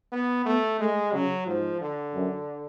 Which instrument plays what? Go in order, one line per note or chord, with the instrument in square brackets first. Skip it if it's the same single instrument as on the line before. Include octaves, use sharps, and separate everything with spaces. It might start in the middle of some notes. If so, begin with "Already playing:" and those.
[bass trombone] B3
[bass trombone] A3 [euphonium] B3
[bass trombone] G#3 [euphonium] A3
[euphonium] C#3 [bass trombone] F#3
[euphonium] G#2 [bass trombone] F3
[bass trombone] D3
[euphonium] F#2